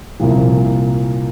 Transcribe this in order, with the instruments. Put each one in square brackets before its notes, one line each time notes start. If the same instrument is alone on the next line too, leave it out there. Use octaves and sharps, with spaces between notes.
[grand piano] C2 A#2 F3